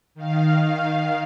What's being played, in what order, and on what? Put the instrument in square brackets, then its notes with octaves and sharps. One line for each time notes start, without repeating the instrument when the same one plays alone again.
[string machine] D#3 F5